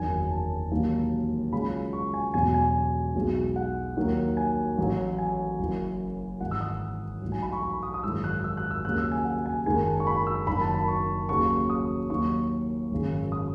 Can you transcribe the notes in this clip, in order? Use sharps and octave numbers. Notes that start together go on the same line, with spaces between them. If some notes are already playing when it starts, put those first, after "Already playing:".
Already playing: F#1 E2 D#3 F#3 G#5
G#5
A5
E1 D#2 D#3 F#3
C#2 C#3 F#3 B5
C#6
G#5
E1 E2 B2 F#3 G#5
G#5
B1 B2 G#3
F#5
D#2 D#3 F#3
G#5
A1 A2 F#3
G#5
F#1 F#2 E3
G#1 G#2 E3 F#5
E6
D#6
B1 A2 E3
G#5
B5
C#6
B5
D#6
D#6
G#1 F#2 E3 G#3 E6
F#6
E6
F#6
E6
D#2 C#3 F#3 F#6
E6
G#5
F#5
F#5
G#5
F#1 F#2 D#3 G#3 G#5
A5
C#6
B5
E6
F#1 F#2 D#3 B5
A5
B5
C#6
D#2 C#3 F#3 C#6
D#6
D#2 D#3 F#3 C#6
G#1 F#2 C#3
D#6